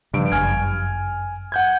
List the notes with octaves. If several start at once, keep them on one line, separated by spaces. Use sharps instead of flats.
G2 C#3 F3 D7
G1 F#2 G#5 F6 G#6
F#5 G6 G#6